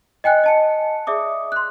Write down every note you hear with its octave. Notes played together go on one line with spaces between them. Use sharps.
D#5 G5 G#5 F#6
D#5 A5 C#7
G#4 D5 E5 D6 D#6
C6 F#6